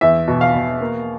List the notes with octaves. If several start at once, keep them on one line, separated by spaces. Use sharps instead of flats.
E2 E5
B2
F5
B2
A#3